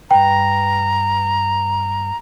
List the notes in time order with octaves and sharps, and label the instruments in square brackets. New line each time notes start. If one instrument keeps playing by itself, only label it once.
[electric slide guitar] G2 B4 [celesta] G5 [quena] A#5